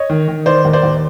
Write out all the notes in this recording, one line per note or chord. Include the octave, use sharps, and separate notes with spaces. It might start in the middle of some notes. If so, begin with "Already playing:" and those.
Already playing: C#5 D#5
D#3
D#3
D#3 C5 D5
D#2
C5 D5
D#2